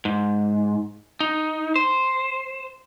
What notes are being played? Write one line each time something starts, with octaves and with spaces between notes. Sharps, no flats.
G#2
D#4
C5